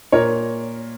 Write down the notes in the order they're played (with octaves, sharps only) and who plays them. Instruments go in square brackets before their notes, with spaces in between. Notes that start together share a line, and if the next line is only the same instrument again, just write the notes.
[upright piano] A#2 A#4 C#5